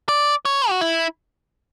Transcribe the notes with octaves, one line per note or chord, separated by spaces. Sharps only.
D5
C#5
F#4
E4